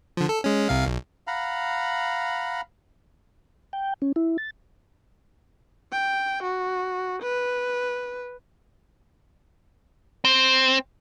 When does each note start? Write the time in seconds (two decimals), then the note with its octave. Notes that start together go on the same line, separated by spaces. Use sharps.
0.17 D3 F3
0.29 A4
0.44 G#3 C#4
0.69 C2 C3 F5
0.86 B1
1.27 F5 F#5 A#5 B5
3.73 G5
4.02 C#4
4.16 E4
4.38 A6
5.92 G5
6.43 F#4
7.22 B4
10.25 C4